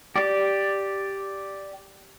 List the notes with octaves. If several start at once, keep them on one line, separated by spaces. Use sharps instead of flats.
G4 D5